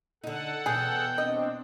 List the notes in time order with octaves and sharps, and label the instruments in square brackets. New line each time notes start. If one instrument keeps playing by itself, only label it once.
[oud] D3 D#4 [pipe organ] A4 F#5
[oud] E2 B2 [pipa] G#4 [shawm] G5
[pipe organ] C4 D4 [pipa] D#5